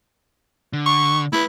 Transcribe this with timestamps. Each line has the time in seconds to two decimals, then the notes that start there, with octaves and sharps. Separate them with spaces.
0.73 D3
0.86 C#6
1.33 A3 E4 B4